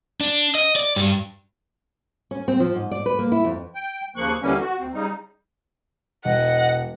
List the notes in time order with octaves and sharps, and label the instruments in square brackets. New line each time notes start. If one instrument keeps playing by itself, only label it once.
[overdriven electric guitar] D4
D#5
D5
G2
[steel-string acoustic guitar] C#4
C4
F3
G#2
D5
B4
A#3
E4
F2
[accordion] G5
D#2 C#3 F3 A#3 C#6 F#6
D#2 D3 E3 G3 A#3 C#4
F#4
D2 C4
C#3 G3 D#4
[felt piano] E1 [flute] D#5 [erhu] F#5